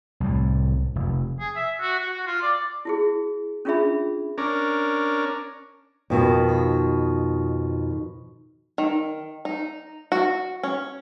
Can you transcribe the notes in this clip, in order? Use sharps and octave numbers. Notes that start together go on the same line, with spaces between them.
C2 A2
F1
G#4
E5
F#4
F#4
F#4
F4
D5
E4 F#4 G#4
C#4 D4 F4 G#4 E5 B5
C#4 D4 A#4
F2 B2 D#3
D#3
D#4
F#4
C#4